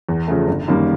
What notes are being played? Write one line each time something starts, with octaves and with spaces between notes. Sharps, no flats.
E2
C#3 F3 A3
G1
F#2 D#3 G3 A#3